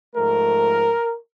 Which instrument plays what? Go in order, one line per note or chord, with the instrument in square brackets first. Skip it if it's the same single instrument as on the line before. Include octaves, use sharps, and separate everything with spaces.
[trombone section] G#2 F3 A3 A#4